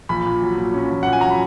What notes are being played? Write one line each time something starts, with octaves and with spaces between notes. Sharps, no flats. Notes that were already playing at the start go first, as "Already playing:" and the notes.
A#1 B5
A#2
F#3
A#2
C#4
A#1
A#2 F#5
G#5
F#3 A#5
B5